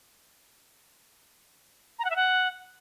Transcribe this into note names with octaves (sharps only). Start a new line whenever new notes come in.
A#5
F#5
E5
F#5